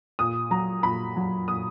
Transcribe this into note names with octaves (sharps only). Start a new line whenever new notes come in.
A#2 D#6
F#3 A#5
A#2 B5
F#3
A#2 D#6